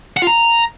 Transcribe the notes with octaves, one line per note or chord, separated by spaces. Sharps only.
F#5
F4
A#5